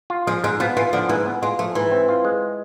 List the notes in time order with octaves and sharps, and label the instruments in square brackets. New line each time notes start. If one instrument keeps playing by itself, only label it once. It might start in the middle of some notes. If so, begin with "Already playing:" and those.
[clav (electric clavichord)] F4
[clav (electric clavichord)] F3 [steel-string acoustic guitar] G#3
[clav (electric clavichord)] G#2 [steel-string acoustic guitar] G#3
[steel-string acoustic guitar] F3 [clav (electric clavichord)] B3
[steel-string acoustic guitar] E3 [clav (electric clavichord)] F4
[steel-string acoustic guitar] D3 [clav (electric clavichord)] F3
[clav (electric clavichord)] G#2 [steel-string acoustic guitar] E3
[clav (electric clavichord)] B3
[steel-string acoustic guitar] G#3 [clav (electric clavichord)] F4
[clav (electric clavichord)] F3 [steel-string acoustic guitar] A3
[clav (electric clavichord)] G#2 [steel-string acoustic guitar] E3
[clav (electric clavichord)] C4
F4
G#3